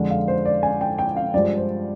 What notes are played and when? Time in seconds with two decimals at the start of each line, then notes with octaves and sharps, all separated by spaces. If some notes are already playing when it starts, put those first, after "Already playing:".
Already playing: F2 D3 G#3
0.10 F5
0.28 C5
0.45 D5
0.63 G#5
0.81 G5
0.98 G5
1.16 F5
1.34 G2 F3 G#3 D5
1.57 C5